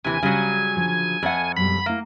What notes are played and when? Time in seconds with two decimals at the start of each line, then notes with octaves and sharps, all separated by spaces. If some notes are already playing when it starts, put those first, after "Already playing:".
0.05 D#2 C3 E3 G4 G#5
0.23 C#3 F#3 G3
0.76 D3 F3
1.23 F2 A4 E5 F#5
1.57 F#2 B2 G3 B5
1.86 A3 A#3 E4